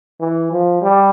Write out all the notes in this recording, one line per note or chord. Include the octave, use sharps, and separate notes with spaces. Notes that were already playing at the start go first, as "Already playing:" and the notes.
E3
F3
G3